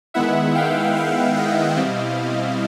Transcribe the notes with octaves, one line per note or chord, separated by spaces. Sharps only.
D#3 G#3 B3 E4 E5 F#5
F5 G5
F5 G5
D#5 F5
B2 G3 C4 E4